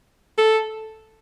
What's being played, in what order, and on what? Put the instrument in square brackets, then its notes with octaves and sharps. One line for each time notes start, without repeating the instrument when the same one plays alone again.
[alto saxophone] A4